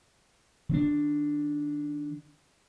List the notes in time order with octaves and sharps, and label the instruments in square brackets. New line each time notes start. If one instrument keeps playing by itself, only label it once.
[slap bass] D#3 C4 D4